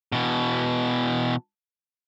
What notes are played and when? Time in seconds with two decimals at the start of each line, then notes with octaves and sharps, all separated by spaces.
0.12 B2 E3